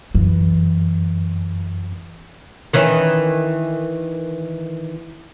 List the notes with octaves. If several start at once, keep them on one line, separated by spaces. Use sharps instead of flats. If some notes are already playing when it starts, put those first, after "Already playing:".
F#2 E3
D#3 E3 C#4